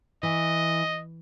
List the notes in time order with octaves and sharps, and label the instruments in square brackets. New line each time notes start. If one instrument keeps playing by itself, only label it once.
[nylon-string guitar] E3 [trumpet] D#5